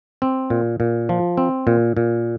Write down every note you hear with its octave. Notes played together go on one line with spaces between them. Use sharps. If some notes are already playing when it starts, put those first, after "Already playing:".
C4
A#2
A#2
F3
C4
A#2
A#2